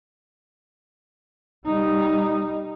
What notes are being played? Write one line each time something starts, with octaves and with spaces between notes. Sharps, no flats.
G3 D#4